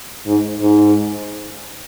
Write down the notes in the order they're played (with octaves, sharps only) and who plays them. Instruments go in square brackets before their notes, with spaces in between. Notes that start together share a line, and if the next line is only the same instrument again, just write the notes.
[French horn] G#2
G#2